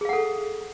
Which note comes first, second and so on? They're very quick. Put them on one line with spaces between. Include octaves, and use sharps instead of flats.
G#4 F5 F#5 A4